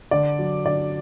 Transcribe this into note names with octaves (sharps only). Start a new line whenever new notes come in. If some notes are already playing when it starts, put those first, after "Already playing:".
D3 D5
F#3
D3 D5